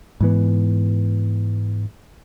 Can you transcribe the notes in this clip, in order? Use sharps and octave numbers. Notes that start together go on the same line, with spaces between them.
G#2 E3 B3